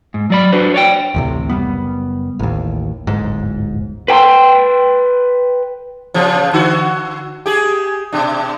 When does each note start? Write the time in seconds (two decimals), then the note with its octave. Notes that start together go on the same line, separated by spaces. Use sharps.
0.14 G#2
0.30 F#3 D5 B5
0.52 D4 F#4 B4 C5
0.74 C#5 D5 G5
1.15 A1 D2 C3
1.50 F#1 G3 B3
2.39 A1 D#2
3.07 D1 G1 G#2
4.08 B4 G5 A5 C6
6.14 A#2 C#3 F3
6.53 D3 F#4
7.46 G4 G#4
8.12 B2 D4